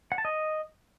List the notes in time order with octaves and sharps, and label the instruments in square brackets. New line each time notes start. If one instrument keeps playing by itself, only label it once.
[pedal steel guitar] F#5
A5
D#5